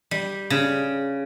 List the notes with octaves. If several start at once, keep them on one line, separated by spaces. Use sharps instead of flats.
G3
C#3